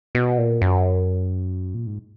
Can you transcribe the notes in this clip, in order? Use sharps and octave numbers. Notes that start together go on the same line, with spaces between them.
B2
A#2
F#2
A#2
G#2